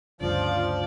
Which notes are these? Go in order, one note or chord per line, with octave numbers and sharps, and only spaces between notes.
D2 G2 C#3 F3 F4 D5